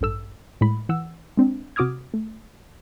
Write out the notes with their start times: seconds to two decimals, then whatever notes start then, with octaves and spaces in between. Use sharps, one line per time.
0.01 A1 G2 A4 E6
0.61 A2 G#3 B5
0.89 E3 F#5 E6
1.37 G#3 C4 D4
1.76 C3 F#4 D6 D#6 F6 G#6
2.14 A3